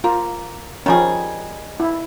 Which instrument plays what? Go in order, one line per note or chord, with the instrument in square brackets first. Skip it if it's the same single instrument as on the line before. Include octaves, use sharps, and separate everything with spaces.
[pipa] A#3 [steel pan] F4
[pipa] D#3 G3 G#4 [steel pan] F3 C#4
[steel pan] E4